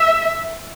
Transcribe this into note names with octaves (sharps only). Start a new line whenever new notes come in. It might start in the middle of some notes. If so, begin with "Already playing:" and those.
Already playing: E5